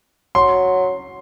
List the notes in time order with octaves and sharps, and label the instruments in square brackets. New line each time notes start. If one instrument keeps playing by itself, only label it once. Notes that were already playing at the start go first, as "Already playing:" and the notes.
[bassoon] F#3 [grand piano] C6